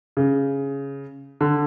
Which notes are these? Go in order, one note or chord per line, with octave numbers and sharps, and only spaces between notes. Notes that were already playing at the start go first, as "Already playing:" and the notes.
C#3
D3